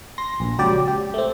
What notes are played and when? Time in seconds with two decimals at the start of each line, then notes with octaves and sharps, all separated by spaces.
0.18 C6 A#6
0.40 A#1
0.58 C#2 F#3 G4 D5
0.87 G4
1.14 A3 C4